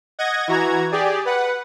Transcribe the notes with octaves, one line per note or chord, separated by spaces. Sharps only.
D#5 F#5 G#6 A#6
E3 F#4 A#5 G#6
G4 G#4 D5
B4 F#5